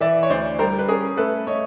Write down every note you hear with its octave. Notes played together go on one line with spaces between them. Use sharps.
E3 D5 E5
C#5
D2 C5 D5
G3 A#4 C5
B4
C#4 G#4 A#4
A3 A4 B4
A3 C#5 D#5